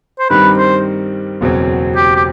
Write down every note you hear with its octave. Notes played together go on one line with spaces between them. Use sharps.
C5
G2 D#3 G3 C4 D#4 B4
C5
F#1 E2 B2 F#3 C4
G4
G4